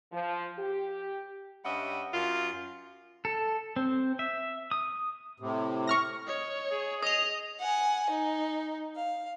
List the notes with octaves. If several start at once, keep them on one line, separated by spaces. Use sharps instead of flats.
F3
G4
G2 G3 C#4 D#5 E5 F#5
F#2 F4
A4
C4
E5
D#6
A2 C3
C#6 F6 A#6
C#5 D#5
G#4
D#5 D#6 F7
F#5 G#5
D#4
F5